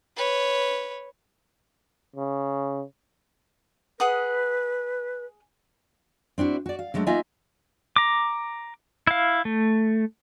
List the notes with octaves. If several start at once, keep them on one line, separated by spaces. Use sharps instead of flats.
B4 C#5
C#3
G#4 B4 F#5 D#6
C4 D4 E4 F#4
F#4 D5
F5
D3 F#3 G#3 A3 D4
A#3 D#4 F4 D#5 E5 G#5
A#5 D6
E4 F5
A3